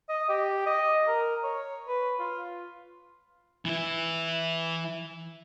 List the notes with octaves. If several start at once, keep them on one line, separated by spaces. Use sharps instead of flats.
D#5
G4
D#5
A#4
C#5
B4
F4
E3 E4